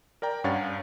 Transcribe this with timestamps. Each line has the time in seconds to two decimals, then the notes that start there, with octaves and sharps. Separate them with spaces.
0.22 A#4 D5 G5 A#5
0.44 G2 C#4 C#5 F5 F#5 A6